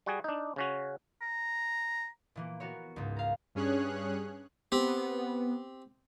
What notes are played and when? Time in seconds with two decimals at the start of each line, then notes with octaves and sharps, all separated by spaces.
0.06 G3 F#4 G#4
0.24 D4 D#4
0.56 C#3 C#4 F#4
1.21 A#5
2.35 A#2 E3 A#3
2.60 B3 F#4 A#4 C#5
2.96 C#2 G#2
3.16 F5 A#5
3.55 G2 C#4 G#4 C#5 F#6
4.72 B3 C4 G4